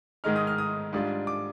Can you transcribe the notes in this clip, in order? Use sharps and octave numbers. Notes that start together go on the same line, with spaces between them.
G#2 D#3 G#3 D#4 F6
D#6
F6
D#6
G#2 G3 D4 F4
D6